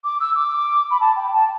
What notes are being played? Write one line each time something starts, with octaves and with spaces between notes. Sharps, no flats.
D6
E6
D6
B5
A5
G5
A5